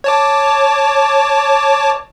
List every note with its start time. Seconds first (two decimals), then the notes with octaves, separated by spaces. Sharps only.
0.04 C#5 A5 D6